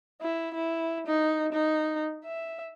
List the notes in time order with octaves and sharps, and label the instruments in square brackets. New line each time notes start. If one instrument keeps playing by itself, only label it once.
[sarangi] E4
E4
D#4
D#4
E5